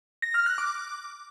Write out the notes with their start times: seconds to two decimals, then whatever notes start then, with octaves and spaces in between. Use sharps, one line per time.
0.22 A#6
0.34 F6
0.46 F#6
0.58 D6